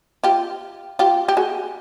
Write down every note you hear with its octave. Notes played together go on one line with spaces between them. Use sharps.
F4 G4
F4 G4
G4
F#4 G#4